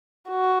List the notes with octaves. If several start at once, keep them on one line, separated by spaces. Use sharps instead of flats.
F#4